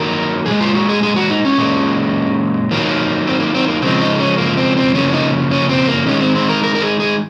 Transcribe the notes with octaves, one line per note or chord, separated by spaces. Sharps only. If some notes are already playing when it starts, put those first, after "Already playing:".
Already playing: D#3 F#3 A#3 A#4
A#2 G#3 G#4
F4
F#4
G#4
G#4
F#4
D#4
C#4
A#2 G#3
D#3 F#3 A#3
C4
A#3
C4
A#3
C#3 F3 G#3 C4
D#4
C#4
A#3
C4
C4
C#3 F3 A#3 C#4
C#4
D#4
C#4
C4
A#3
D#3 G#3 C#4
C4
C4
A#4
A#4
A#4
G#4
G#4